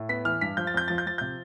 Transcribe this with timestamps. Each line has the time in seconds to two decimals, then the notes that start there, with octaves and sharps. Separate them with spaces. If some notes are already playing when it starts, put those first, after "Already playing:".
Already playing: A2
0.09 B3 B6
0.25 E3 F6
0.41 G2 B6
0.57 F3 G6
0.67 A6
0.74 F2 G6
0.88 F3 A6
0.98 G6
1.06 F3 A6
1.18 C3 G6